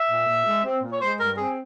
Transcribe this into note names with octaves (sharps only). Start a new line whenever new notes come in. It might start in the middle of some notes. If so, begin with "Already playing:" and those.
Already playing: E5
A#2
A#2
G#3
C4
A#2
C#5
G#3 C5
G2 A#4
C4 G#4